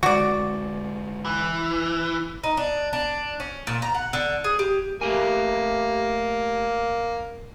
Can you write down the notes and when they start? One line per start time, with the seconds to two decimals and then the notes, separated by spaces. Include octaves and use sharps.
0.03 D3 G#3 F#4 D5
1.25 E3
2.44 D#4
2.57 D4
2.93 D4
3.40 C#4
3.67 A#2
3.82 A#5
3.95 F#5
4.13 D3
4.44 G#4
4.59 G4
5.01 A3 A#3 G4 G#5